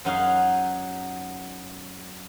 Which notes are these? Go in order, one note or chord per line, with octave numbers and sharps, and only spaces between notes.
F#2 F#3 D#4 F#4 G#4 F5